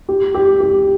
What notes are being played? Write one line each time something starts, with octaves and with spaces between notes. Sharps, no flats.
G4
G4
G4